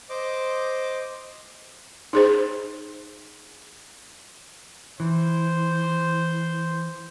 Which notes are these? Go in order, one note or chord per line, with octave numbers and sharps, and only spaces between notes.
C5 D#5 D6
D#4 G#4 C5
E3 C5